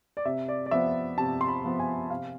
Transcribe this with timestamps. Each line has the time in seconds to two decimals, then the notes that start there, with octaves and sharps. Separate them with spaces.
0.17 D5
0.25 C3 E5
0.48 D5
0.66 D5
0.71 F3 B3 E5
1.18 C3 A5
1.41 C6
1.48 B5
1.65 F3 B3
1.79 G#5
2.10 C3 F5